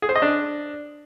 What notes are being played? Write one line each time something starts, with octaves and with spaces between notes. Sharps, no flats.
G#4
C5
D#5
D4